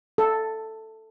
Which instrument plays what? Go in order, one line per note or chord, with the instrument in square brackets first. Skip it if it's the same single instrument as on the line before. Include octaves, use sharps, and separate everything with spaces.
[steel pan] A4